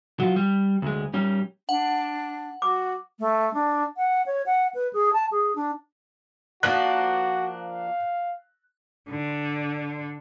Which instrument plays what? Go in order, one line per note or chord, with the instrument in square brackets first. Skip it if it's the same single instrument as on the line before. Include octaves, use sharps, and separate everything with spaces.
[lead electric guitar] F#3 F4
G3
D2 G#3
G3 C#4
[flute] D4 [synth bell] F#5
[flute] F#4 [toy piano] D6
[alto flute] A3
D4
F#5
C#5
F#5
B4
G#4
A5
G#4
D4
[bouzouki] F3 A#3 D4 [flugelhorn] F#4 [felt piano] F#6
[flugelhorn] F5
[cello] D3